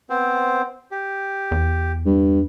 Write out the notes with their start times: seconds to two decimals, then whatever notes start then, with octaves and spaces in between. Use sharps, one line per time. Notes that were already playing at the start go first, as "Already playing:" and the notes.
0.10 B3 C4 C5
0.91 G4
1.51 E2
2.05 G2